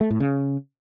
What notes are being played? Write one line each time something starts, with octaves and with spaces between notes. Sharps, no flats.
A3
A2
C#3